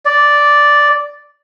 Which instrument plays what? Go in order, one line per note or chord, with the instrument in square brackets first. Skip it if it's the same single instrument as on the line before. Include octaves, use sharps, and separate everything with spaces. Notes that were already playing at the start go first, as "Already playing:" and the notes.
[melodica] D5